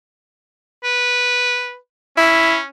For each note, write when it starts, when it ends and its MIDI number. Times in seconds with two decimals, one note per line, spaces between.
0.84 1.76 71
2.17 2.65 61
2.17 2.57 64